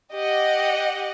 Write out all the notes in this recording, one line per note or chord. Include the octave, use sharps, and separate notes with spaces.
G4 D#5 F#5